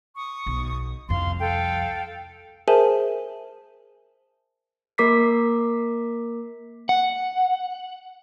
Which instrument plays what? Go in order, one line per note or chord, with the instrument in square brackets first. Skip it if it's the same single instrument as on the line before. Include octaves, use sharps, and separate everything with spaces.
[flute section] C#6 D#6
[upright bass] B1
[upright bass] C2 F2 [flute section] F5 C6
[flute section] A4 F5 G5
[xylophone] G#4 A#4 C5 E5 G#5 A5
[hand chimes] A#3 A#4 D6 B6 C7
[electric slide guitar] F#5